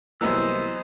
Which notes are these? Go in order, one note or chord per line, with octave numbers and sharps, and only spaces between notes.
C2 E3 F#3 A#3 B3 C5 D#5 E6